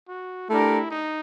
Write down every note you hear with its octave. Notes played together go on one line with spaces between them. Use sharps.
F#4
A3 D4 E4 G4 A#4
D#4